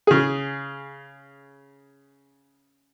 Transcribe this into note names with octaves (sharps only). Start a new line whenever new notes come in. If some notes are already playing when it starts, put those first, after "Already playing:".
C#3 G#4